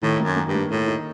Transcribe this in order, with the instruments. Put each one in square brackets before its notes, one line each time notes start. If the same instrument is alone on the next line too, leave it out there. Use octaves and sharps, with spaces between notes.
[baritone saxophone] A2 [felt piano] D#3
[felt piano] A#3
[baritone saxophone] F#2
[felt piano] A#3
[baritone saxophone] G2
[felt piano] A#3
[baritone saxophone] A2 [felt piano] A#3
[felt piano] D#4